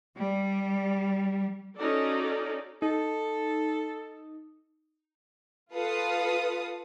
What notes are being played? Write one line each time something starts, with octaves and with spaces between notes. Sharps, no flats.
G3
C#4 D#4 F#4 A4 D5
D#4 A4
F4 A4 B4 F5 D#6